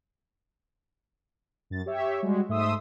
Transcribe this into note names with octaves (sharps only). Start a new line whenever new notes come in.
F#2 A6
G4 C#5 E5
G3 G#3 F#4
G#2 A3 E5 C6 D#6 E6